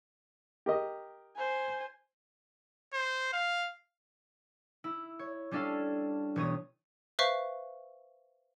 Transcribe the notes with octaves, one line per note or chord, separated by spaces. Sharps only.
G4 A#4 D#5
C5 G#5
C5
F5
E4
C#5
G3 C#4 D4 A4 F5
E1 C#5 D#6
B4 C5 E5 F5 C#6